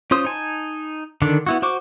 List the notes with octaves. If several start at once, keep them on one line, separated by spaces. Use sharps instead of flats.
C#4 F4 C5 D#6
D#4 G#5 A5
D3 D#3 D4
B3 E4 F#4
F#4 C5 C#6 D6